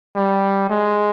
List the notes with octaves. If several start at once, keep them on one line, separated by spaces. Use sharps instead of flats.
G3
G#3